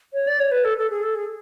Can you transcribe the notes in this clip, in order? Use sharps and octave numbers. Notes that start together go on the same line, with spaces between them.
C#5
D5
C#5
B4
A4
A4
G#4
A4
G#4